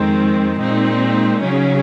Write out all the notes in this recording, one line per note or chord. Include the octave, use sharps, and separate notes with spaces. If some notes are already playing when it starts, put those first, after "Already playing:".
Already playing: F2 D#3 G#3 C4
A#2 G#3 C4 D#4
C#3 F#3 C#4